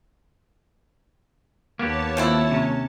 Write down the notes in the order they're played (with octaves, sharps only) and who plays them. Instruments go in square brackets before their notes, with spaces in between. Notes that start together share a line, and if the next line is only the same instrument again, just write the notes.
[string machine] D#2 C#5 A5 [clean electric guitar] A#3 B3 G4
[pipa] F3 C4 E4
[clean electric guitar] C3 C#4